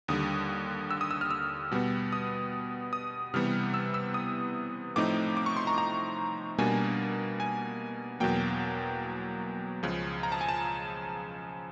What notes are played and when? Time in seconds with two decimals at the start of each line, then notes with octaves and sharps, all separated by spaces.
0.08 D#2 D3 G3 D#6
0.91 E6
1.01 D#6
1.11 E6
1.21 F6
1.31 E6
1.71 B2 G3 B3
2.13 D#6
2.93 D#6
3.34 C3 E3 G3 B3 F6
3.74 E6
3.94 E6
4.14 D#6
4.96 A2 F3 A3 C4 D#4 D6
5.37 D6
5.46 C#6
5.57 C6
5.67 A#5
5.78 A#5
6.58 B2 G3 A#3 D4 G#5
7.40 G#5
8.20 E2 B2 F#3 A#3 G5
9.83 C#2 C#3 F3
10.23 A#5
10.32 A5
10.41 G#5
10.49 A5